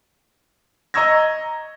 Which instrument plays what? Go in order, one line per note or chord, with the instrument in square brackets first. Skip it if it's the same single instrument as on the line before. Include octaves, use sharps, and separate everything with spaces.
[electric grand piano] D#5 A#5 C#6 E6 G#6 A#6